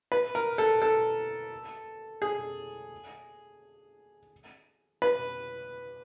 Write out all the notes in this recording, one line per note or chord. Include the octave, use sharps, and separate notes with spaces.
B4
A#4
A4
A4
G#4
B4